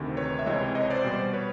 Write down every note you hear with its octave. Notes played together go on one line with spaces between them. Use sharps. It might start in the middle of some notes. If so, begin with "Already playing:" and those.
Already playing: D2 C3 D#3
B4 C#5
E5
C#2 C3 E3 G#3 C#5 D#5
C#5 D#5
C5 D5
B2 G3 B3
B4 C#5